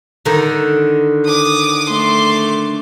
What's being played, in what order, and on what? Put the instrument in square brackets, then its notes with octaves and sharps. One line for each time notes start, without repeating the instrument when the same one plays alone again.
[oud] D3 D#3
[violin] D6 D#6
[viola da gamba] A3 [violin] C6 D6